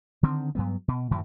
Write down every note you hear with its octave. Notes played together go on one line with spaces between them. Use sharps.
D3 D#3 C4
G2 F#3 B3
B2
F#2 A2 D#3 F#3